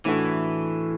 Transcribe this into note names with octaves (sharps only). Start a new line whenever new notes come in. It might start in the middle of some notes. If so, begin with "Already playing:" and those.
A2 E3 A3 D4 F#4 A4